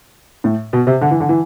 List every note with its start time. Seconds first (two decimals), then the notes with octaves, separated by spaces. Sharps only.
0.44 A2
0.73 B2
0.87 C3
1.01 D3
1.11 E3
1.20 D3
1.29 E3